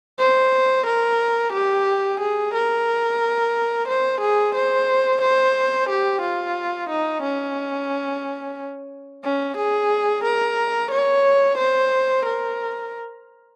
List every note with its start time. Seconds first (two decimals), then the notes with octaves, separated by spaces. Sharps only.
0.19 C5
0.86 A#4
1.53 G4
2.20 G#4
2.54 A#4
3.88 C5
4.21 G#4
4.55 C5
5.22 C5
5.89 G4
6.22 F4
6.90 D#4
7.23 C#4
9.24 C#4
9.57 G#4
10.24 A#4
10.91 C#5
11.58 C5
12.25 A#4